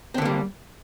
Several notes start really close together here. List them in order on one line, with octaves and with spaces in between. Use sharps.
C4 D3 A#3 G3